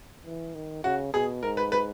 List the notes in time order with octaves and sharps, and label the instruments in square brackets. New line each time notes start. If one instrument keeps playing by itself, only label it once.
[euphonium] E3
D#3
[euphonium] C#3 [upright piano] F#4
[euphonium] B2 [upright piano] G#4
[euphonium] G#2 [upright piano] A#4
[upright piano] B4
B4